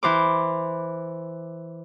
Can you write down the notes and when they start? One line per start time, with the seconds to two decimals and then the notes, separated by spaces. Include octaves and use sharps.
0.03 E3 C5 D6